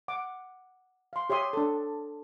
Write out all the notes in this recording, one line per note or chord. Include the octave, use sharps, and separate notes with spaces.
F#5 D6
F5 C6
G4 C#5 E5 C6 D#6
D4 A4